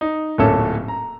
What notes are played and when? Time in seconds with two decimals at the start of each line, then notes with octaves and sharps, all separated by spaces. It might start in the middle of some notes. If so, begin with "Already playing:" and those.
0.01 D#4
0.38 D1 A#2 A3 C#4 A4 E6
0.88 A#5